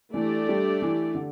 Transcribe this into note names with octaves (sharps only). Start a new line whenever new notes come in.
E3 A3 D4 G4 D5
G3
E3
D3